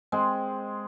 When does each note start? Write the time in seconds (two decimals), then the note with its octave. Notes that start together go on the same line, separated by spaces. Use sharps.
0.12 G#3 C4